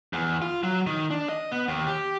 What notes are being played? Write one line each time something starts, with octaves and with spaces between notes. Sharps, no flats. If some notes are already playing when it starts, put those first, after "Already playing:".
E2
F4
F#3
D#3
D4
D#5
B3
D#2
G4